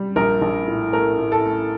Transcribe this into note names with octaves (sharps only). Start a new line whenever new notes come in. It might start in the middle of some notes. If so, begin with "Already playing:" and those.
Already playing: G3
A#1 A#4
A#1
A2
A3 A#4
A2
A4
A3